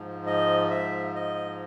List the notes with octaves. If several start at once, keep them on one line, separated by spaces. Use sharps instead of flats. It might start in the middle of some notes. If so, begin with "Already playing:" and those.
Already playing: G#2 F3
D#5
E5
D#5